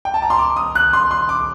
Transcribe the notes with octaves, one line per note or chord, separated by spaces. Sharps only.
G5
A5
A#5
C6
D6
D#6
F#6
C6
C6
D6